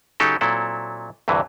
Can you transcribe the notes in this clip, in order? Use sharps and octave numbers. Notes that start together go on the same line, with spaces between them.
C#3 F#3 D#4 G4 A4
A#2 F#3 C4 E4 A4
D2 G2 C3 E3